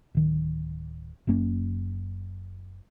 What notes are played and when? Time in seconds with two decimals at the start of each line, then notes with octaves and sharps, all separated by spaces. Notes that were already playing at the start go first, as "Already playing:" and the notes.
0.15 D1 D#3
1.27 F#1 F#2 A#3 C#4